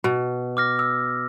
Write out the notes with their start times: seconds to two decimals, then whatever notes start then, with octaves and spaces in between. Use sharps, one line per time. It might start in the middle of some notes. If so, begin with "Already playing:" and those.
0.04 B2
0.57 D6 F6 A#6
0.79 E6